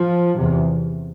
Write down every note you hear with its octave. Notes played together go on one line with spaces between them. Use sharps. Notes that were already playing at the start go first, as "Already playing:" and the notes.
Already playing: F3
E2 C3